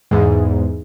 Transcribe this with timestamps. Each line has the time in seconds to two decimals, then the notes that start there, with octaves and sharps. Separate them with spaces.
0.11 E2 G#2